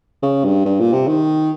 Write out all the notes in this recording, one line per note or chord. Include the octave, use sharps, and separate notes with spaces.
C#3
G2
G2
A#2
C3
D#3